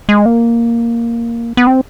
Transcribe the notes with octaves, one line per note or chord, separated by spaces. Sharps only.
G#3
A#3
B3
C4